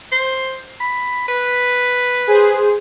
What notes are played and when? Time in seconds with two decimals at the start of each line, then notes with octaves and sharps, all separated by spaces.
0.12 C5
0.80 B5
1.28 B4
2.27 G#4 C5